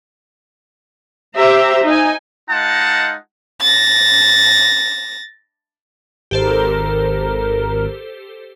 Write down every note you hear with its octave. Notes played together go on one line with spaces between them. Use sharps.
G4 C5 E5 A#5
D#4 G#5
G#3 D#4 F4 F#5 A5
A6 A#6
G#1 G4 A4 A#4 C5